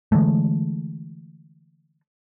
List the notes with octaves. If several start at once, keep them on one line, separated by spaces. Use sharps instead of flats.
D3 E3 G#3 A3